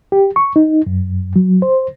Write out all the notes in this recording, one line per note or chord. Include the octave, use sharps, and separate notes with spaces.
G4
C#6
D#4
F#2
F#3
C5